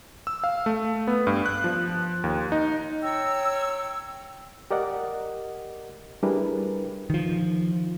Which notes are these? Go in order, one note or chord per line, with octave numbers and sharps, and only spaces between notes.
E6
F5
A3
B3
G2
F#6
F3
D#2
D#4
C#5 G5 A#5 E6
G4 A#4 D5 D#5 F#5
G3 D4 E4 G#4 A#4 B4
D#3 F3